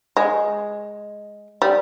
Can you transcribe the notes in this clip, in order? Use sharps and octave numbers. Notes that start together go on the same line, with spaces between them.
G#3
G3